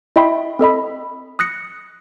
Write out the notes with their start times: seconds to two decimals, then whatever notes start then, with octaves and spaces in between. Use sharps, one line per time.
0.16 E4 D#5 E5 G5 B5 C6
0.59 C4 A4 D#5 B5
1.39 D#6 F#6 A#6 C#7